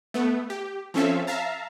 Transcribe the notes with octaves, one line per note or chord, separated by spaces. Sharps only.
A3 B3
G4
F3 C4 C#4 A4 E5 F5
E5 F5 A5 A#5